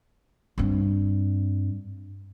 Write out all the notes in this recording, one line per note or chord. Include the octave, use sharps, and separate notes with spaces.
G2 C4